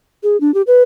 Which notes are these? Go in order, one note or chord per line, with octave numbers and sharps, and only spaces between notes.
G#4
D4
G4
B4